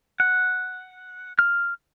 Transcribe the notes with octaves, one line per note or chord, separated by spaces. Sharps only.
F#5
F6